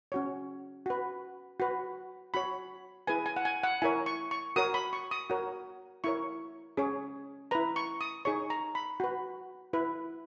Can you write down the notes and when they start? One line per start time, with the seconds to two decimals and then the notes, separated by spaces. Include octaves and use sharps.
0.12 C#4 F#4 C#5
0.86 F#4 B4
1.60 F#4 B4
2.34 F#4 C#5 B5
3.07 E4 G#4 B4 G#5
3.26 G#5
3.36 F#5
3.45 G#5
3.63 F#5
3.82 E4 A#4 C#5 G#5
4.06 C#6
4.31 C#6
4.56 F#4 A#4 C#5 D#6
4.74 B5
4.93 C#6
5.11 D#6
5.30 F#4 A#4 C#5
6.04 E4 A#4 C#5 C#6
6.77 C#4 G#4 C#5
7.51 E4 B4 A#5
7.76 C#6
8.01 D#6
8.25 D#4 G#4 C#5 C#6
8.50 A#5
8.75 B5
9.00 F#4 B4
9.73 E4 B4